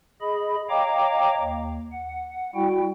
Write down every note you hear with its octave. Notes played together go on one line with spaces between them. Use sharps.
G#4 D#5 B5
C#5 D#5 F5 G5 A#5 D6
D#2
F#5
G3 E4 F#4 G5